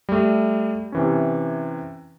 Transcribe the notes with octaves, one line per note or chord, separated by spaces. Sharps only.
G3 A3
C3 E3 C#4